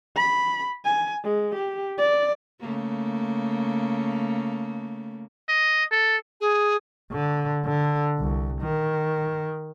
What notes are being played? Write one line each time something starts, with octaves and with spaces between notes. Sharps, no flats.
B5
G#5
G#3
G4
D5
C#3 A3 A#3
D#5
A4
G#4
D3
D3
C2
D#3